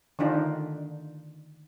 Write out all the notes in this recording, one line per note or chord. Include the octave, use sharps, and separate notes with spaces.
D3 D#3 D4 D#4 F4